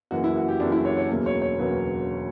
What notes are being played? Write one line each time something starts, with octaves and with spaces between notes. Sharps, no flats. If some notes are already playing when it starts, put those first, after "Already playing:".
F#2 C#3 E3 A#3 F#4
E4
F#4
G4
F#2 C#3 E3 A#3 D4
E4
C#5
C#5
E1 D2 C#3 F#3 A#3
C#5
C#5
E1 D2 C#3 F#3 A#3 B4